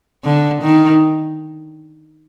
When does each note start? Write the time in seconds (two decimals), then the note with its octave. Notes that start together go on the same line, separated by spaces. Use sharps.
0.25 D3
0.62 D#3